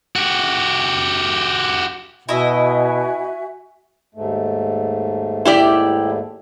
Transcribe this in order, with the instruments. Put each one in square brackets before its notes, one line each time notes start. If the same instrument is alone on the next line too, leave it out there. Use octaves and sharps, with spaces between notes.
[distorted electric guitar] F#4 G4
[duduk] B2 [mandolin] E4 D#5 [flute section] F#4 E5 G#5
[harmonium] D#2 G#2 A3
[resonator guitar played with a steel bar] E4 G4 D5